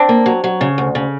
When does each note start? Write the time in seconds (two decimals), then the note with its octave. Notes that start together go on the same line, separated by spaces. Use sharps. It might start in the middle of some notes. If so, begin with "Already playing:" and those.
Already playing: C4 D4
0.09 A#3
0.26 F#3
0.44 F#3
0.61 C#3
0.78 D2
0.95 C#3